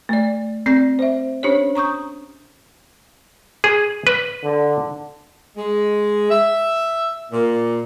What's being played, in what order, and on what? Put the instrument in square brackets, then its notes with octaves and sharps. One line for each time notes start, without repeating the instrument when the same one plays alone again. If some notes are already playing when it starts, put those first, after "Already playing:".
[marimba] A3 D5
C4 D5 G6 A#6
C5 E5
C#4 D4 G4 C5 C#5
A#5 C#6 D#6 G6
[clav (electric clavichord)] G#4
B4
[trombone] D3
[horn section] G#3
E5
A#2